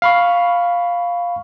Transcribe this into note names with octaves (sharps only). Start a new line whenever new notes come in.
F5 B5 C#6